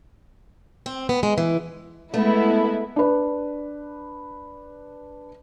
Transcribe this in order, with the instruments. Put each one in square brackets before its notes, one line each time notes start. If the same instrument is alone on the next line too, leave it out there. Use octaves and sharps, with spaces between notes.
[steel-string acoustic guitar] C4
B3
G#3
E3
[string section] G#3 B3 E4 [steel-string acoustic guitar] A3
[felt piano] D4 B4